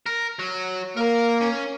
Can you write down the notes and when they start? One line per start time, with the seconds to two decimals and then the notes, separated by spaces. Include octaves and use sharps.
0.06 A#4
0.39 F#3
0.97 A#3 A#4 A#5
1.41 C#4